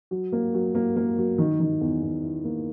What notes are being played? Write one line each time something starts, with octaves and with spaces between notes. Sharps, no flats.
F#3
A#3
F#3
A#3
A#3
F#3
D#3
D#3
E2
E2
E4
A#3